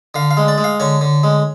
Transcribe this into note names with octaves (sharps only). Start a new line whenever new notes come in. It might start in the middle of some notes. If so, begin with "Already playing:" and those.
D3 F5
F5
G#3
D5
G#3
F5
D3 C#5
D3
G#3